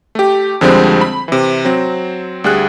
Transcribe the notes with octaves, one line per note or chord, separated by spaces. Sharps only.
A3 G4
F2 D3 F3 G3 G#3 C4
B5
C3 E3
F#3 C4
D2 G3 G#4 F#6